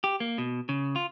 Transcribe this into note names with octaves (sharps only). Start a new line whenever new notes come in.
G4
A#3
B2
C#3
F4